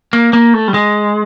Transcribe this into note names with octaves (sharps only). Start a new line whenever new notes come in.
A#3
A#3
A3
G3
G#3